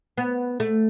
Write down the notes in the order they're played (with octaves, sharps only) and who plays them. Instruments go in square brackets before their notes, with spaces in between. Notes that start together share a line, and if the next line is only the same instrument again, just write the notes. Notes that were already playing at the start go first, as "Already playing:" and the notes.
[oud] B3
A3